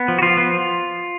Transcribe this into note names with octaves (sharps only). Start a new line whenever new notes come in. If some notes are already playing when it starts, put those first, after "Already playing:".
Already playing: B3
F3
F#4
F3 F4
B3